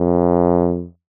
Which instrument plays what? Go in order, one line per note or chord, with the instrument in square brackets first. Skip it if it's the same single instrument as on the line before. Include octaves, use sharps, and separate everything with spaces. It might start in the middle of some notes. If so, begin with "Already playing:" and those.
Already playing: [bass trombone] F2